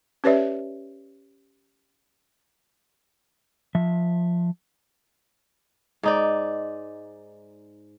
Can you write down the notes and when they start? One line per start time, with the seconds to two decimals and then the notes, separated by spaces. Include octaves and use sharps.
0.24 C#4 G4 B4 C#5 D5 E5
3.75 F3 E5
6.03 G#2 D#4 D5